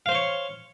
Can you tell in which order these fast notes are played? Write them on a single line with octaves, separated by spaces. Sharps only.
F5 C5 C6 C#5